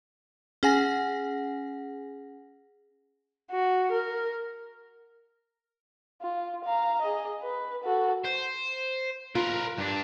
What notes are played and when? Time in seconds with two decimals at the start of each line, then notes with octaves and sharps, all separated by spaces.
0.63 C#4 G#4 F#5 G#5 A#6
3.51 F#4
3.92 A#4
6.22 F4
6.64 F5 A#5
7.02 G#4 D#5
7.43 B4
7.84 F#4 A4
8.25 C5
9.35 F4 A#4 B4
9.78 G2 D4